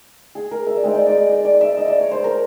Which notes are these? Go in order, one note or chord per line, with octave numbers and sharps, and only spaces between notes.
G#4
A#4
E5
D5
G#3 C4 D#4 D#5
D5
D5
D#5
D5
D5
E5
D#5
D5
C#5
C5
A#4